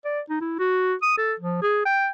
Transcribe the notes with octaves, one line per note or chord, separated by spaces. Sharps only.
D5
D#4
E4
F#4
D#6
A4
F3
G#4
G5